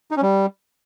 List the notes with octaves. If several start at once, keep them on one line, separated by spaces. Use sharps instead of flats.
D#4
C#4
G3